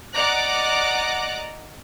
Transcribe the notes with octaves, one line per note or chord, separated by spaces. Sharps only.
D5 D#5 F#5 A#5 D6 F#6